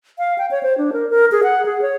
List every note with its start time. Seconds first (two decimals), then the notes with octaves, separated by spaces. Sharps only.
0.18 F5
0.38 G5
0.51 C#5
0.63 C5
0.78 D4
0.93 A#4
1.10 A#4
1.32 G#4
1.43 F#5
1.66 G#4
1.82 C#5